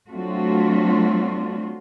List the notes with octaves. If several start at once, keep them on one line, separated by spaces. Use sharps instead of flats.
F#3 A3 C4 D4 F4 F#4